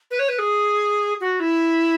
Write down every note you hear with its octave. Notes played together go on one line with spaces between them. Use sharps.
B4
C#5
B4
G#4
F#4
E4